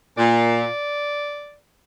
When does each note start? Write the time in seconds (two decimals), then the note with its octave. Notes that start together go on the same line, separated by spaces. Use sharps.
0.17 A#2 D5